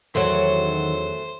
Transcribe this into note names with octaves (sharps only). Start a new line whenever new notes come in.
E2 D#3 F#3 A3 C#4 F#4 C5